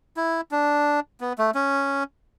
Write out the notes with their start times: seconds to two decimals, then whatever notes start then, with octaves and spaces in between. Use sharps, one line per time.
0.17 E4
0.51 D4
1.21 B3
1.39 A3
1.55 C#4